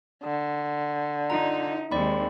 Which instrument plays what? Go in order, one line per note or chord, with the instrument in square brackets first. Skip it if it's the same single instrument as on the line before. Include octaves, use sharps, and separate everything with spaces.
[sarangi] D3
[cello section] D#4 [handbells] F4 A#5
[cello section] D#2 G#3 [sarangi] C4 [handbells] D5 B5